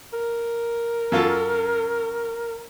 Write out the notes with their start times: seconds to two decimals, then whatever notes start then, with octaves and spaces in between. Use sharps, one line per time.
0.13 A#4
1.12 F#2 F4 A4